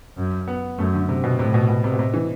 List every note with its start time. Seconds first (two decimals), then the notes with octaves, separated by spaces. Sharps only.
0.17 F#2
0.48 B3
0.79 F#2 A3
0.94 D3
1.09 C3
1.24 B2
1.39 A2 C3
1.54 B2
1.69 B2
1.84 C3
1.94 B2
1.99 C3
2.14 E3